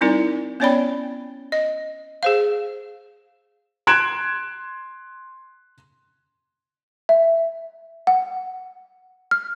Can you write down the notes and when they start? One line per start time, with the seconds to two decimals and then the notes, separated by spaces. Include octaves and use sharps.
0.01 G3 C4 D#4 E4 A#4 D5
0.60 B3 C#4 C#5 D5 G5 B5
1.52 D#5
2.23 G#4 C5 F5
3.87 C6 F#6 G#6 D7 E7
7.09 E5
8.07 F#5
9.31 F6